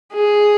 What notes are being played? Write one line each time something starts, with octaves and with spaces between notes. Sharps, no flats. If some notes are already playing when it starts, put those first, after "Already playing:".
G#4